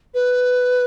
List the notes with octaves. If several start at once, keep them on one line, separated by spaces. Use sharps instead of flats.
B4